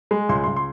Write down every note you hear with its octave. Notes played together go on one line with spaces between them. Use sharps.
G#3
C#2 C6
C6
C#2
C6